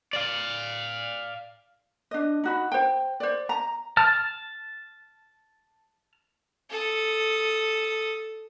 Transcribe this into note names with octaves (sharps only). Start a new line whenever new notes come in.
D5 F5
D4 D#5
D#4 F#4 B5
C5 G5
C5 D5
A#5
A5 F6
A4 D#6